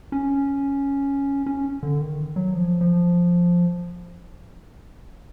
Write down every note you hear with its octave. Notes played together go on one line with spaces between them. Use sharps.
C#4
C#4
D3
D#3
F#3
F3
F3